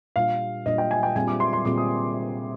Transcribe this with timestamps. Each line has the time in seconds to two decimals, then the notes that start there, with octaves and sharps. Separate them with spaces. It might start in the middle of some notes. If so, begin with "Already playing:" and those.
0.16 A#2 G3 D4 F4 F5
0.66 A#2 G3 D4 F4 D#5
0.78 G5
0.91 G#5
1.03 G5
1.16 A#2 G3 C4 F4 G#4 G#5
1.28 D6
1.40 C6
1.53 C6
1.65 A#2 G3 C4 F4 G#4 D6
1.78 D#6